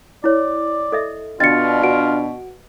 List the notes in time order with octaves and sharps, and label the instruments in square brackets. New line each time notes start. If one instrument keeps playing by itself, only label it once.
[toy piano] E4 C#5 [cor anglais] D5
[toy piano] A4 D#5 E5
[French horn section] B2 D4 [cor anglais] F4 [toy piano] D#5 G5 A#5 [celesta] A6 C#7
[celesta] F#4 F#5 D7 [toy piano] B4